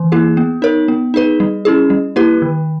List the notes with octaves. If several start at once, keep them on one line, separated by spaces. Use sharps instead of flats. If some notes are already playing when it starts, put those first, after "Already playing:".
Already playing: E3
A#3 E4 G#4
B3
D#4 A#4 C#5
B3
D#4 G#4 B4
G3
C#4 E4 G#4
G3
A#3 E4 G4 B4
D#3